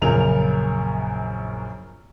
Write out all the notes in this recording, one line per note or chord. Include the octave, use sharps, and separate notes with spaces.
A#1 F#2 C#3 A#4 F7